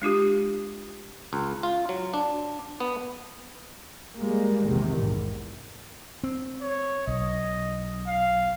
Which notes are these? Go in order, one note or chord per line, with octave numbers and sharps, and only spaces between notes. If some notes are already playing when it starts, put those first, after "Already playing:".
G#3 D4 F4 G4
C#2
F4
F#3
D4
B3
G3 G#3 A#3
A#1 E2 C3 D#3
E2 G#2
C4
C#5
B1 D#5
F5